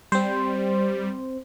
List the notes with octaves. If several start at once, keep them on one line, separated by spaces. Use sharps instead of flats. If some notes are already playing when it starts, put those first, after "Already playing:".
G3 C4 C5